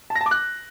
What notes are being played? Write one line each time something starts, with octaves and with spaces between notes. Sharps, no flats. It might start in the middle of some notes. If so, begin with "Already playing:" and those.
A5
A#6
A5
D6
F#6